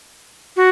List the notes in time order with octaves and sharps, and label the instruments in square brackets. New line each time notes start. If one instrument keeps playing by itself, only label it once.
[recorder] F#4